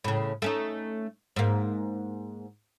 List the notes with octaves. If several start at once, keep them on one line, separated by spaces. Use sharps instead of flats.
A2 C#3
A3 C#4 D#4
G#2 A#3